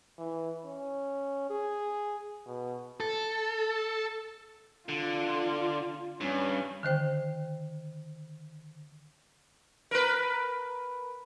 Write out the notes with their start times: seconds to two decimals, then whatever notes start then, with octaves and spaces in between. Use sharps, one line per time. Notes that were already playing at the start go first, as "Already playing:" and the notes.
0.18 E3
0.65 C#4
1.50 G#4
2.46 B2
3.00 A4
4.89 D3 F4
6.21 G2 C#4
6.83 D3 D#3 C5 G5
9.91 A#4 B4